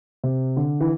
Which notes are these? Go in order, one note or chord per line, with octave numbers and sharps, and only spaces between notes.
C3
D3
E3